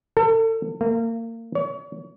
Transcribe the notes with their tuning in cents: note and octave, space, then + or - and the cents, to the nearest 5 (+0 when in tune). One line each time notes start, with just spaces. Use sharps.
A4 +35
A#3 -30
C#5 +35